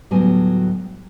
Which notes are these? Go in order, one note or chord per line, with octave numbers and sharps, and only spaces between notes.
D2 A2 F#3 G3 B3 G#5